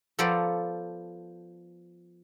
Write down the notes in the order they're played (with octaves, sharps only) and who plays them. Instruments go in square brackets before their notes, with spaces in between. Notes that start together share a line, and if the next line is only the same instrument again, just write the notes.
[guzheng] F3 B3 A4 C5 D5 A#5